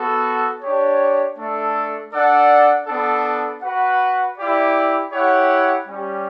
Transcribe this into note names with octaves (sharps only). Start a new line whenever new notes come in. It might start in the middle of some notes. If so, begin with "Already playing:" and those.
Already playing: B3 F#4 A4
D4 G4 C#5
A3 D4 A4
D4 A4 D5 F#5
B3 D4 A4
F#4 B4 F#5
E4 G4 D5
E4 G4 C#5 F#5
G3 C#4 G4